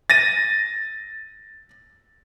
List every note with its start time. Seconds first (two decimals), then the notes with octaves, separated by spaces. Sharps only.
0.10 A6 A#6 D#7